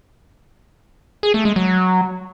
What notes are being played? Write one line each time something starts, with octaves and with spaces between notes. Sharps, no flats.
G#4
A3
G#3
F#3